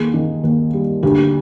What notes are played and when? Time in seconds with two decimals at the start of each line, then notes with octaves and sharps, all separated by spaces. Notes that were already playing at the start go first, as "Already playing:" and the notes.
Already playing: D#2 G#4
0.14 D#3
0.44 D#2
0.73 G3
1.03 D2 G4